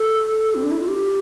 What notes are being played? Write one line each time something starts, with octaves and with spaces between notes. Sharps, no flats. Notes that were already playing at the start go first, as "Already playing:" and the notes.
Already playing: A4
C4
D4
E4
F4
G4